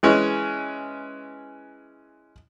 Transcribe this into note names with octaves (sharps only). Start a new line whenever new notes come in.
E3 G#3 C#4